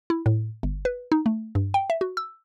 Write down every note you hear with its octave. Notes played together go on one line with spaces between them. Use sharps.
E4
A2
G1
B4
D#4
A3
G2
G5
E5
F#4
E6